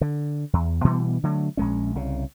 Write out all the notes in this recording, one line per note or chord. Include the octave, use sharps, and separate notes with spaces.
D3
E2
B2 E3 G3 B3
D3 F#3 A3
A#1 G#3 C#4
C2 C#3